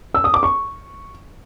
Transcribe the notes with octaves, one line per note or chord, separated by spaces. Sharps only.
E6
D#6
D6
C#6